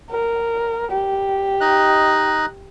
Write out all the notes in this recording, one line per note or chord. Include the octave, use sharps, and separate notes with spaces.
A#4
G4
D#4 D#5 F#6